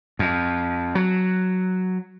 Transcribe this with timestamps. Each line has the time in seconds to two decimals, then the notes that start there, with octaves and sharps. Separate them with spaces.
0.19 F2
0.95 F#3